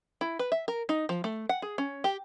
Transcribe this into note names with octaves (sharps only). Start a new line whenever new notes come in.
E4
B4
E5
A#4
D#4
F3
A3
F#5
G#4
C#4
G4